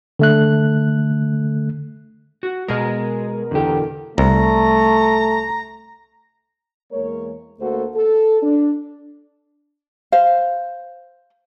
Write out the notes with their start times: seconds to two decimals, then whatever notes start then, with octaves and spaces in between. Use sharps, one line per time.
0.19 D3 A3 F#6
2.43 F#4
2.68 B2 G#3 G#4 A#4 D#5
3.51 E2 D3 E4 G4 A4
4.18 C2 A3 A#5
6.92 E2 G#3 A#3 A#4 C#5
7.60 D2 A3 A#3 F#4 A4 C5
7.96 A4
8.42 D4
10.12 C5 F5